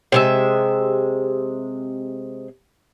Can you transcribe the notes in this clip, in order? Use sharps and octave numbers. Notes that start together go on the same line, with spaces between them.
C3 G#3 E5